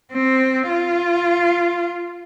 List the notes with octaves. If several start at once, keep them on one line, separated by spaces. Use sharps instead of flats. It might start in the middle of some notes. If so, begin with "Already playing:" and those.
C4
F4